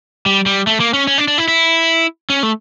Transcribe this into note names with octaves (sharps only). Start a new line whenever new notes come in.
G3
G3
A3
A#3
C#4
C#4
D4
D4
E4
E4
C#4
A3